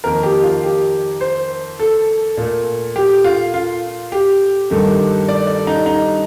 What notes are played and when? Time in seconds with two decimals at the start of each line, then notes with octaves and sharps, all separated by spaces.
0.04 F2 D#3 A#3 A#4
0.23 G4
0.43 F4
0.63 G4
1.21 C5
1.80 A4
2.37 A#2 A3
2.96 G4
3.24 F4
3.54 F4
4.12 G4
4.70 G2 D#3 A3
5.28 D5
5.47 D5
5.67 D#4
5.86 D#4